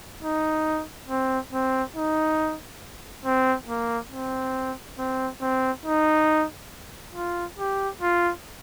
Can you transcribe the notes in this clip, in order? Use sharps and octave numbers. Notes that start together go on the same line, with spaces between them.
D#4
C4
C4
D#4
C4
A#3
C4
C4
C4
D#4
F4
G4
F4